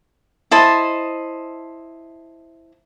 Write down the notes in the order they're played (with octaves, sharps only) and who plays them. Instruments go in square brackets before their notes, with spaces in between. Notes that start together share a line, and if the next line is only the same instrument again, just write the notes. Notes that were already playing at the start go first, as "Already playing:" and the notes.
[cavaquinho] E4 C5 D#5 A5